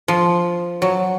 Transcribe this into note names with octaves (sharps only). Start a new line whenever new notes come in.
F3
F#3